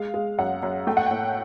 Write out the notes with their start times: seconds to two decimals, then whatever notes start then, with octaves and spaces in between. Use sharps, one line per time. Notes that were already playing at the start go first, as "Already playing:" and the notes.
Already playing: G#3 F5
0.14 G#3
0.38 F#2 F#5
0.63 F#2
0.87 A3 G5
0.97 F#5
1.06 A2 G5